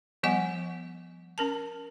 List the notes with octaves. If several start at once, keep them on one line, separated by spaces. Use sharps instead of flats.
F3 G3 B3 D#5 F#5 G#5
C#4 A#4 A5